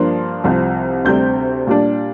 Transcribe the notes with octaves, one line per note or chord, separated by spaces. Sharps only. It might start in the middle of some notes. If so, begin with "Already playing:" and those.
Already playing: G2 F3 A#3 D4 C6
C2 C3 F3 C4
D2 C3 G3 C4 G6
A#2 G3 D4